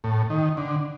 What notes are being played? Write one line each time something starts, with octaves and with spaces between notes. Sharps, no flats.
A2
D#3
D3